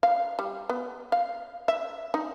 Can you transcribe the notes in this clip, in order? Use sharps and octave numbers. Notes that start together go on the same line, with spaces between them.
F5
G3
B3
F5
E5
D#4